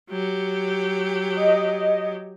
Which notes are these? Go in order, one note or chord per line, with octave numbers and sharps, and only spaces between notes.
F#3 G4
D#5